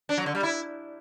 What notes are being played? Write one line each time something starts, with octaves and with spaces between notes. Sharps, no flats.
D4
F#3
D3
G3
E4